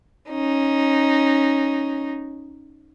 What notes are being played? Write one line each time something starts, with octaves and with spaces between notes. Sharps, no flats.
C#4 D#4